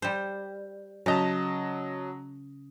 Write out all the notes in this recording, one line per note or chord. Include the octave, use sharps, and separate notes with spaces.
G3 C5
C#3 F#3 D#5 A5 A#5